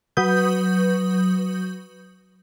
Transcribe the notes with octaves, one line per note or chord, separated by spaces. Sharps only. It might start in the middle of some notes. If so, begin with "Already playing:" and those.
F#3 B4 D#6 G6